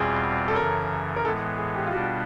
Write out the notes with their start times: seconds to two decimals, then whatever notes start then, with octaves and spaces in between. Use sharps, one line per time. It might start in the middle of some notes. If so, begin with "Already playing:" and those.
Already playing: E2 B2 G3 C4 F4 G#4
0.48 A4
0.56 F#2 C#3 E3 A#4
1.16 A#4
1.24 A2 E3 G#3 B3 A4
1.58 G#4
1.76 G4
1.86 F4
1.92 B2 G3 B3 D4 F#4